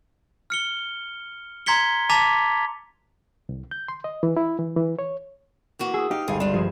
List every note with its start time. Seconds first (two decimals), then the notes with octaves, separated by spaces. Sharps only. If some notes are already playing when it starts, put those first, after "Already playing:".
0.50 F6 C#7 G7
1.66 A#5 C6 G#6 B6 C#7 G7
2.09 A5 A#5 D6 A6 B6 F7
3.49 C2
3.71 G6
3.88 C6
4.04 D#5
4.23 E3
4.37 E4
4.59 E3
4.76 E3
4.99 C#5
5.79 E3 A#3 F#4
5.94 G#4 D#6 E6
6.11 D#4 G4 F5
6.28 G1 C#2 G#4 F5
6.40 G3 D4 F4
6.54 G2 F3 G#4 E7